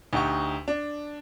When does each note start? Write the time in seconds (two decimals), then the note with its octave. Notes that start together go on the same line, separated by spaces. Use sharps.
0.13 D2 D#4 G4 C#6
0.68 D4